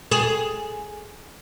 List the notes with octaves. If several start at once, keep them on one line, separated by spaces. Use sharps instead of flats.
G#4